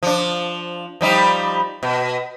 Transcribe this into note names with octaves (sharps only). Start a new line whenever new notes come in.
F3 D4
F3 G3 D#4
B2